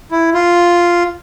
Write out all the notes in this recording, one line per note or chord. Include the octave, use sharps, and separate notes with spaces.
E4
F4